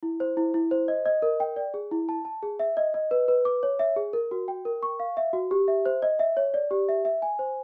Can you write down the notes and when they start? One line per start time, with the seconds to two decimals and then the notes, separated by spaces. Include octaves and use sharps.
0.03 E4
0.20 C5
0.37 E4
0.54 E4
0.71 C5
0.88 D#5
1.06 D#5
1.22 A#4
1.40 G5
1.56 D5
1.74 G#4
1.91 E4
2.09 A5
2.25 A5
2.43 G#4
2.59 E5
2.77 D#5
2.94 D#5
3.11 B4
3.28 B4
3.45 D6
3.63 C#5
3.79 E5
3.96 G#4
4.13 A#4
4.31 F#4
4.48 G5
4.65 A#4
4.83 C#6
5.00 F5
5.17 E5
5.33 F#4
5.51 G4
5.68 E5
5.86 C5
6.02 D#5
6.19 E5
6.37 C#5
6.54 D5
6.71 G4
6.89 E5
7.05 E5
7.22 G#5
7.39 C5